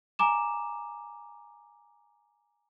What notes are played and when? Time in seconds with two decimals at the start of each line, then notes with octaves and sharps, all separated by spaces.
0.19 G#5 A#5 D6 E7